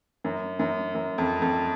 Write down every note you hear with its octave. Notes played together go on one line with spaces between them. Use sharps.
F#2
F#2
F#2
F2
F2